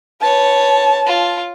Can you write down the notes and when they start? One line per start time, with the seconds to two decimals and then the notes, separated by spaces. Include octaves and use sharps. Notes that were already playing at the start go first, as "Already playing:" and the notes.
0.22 B4 C#5 A5
1.07 F4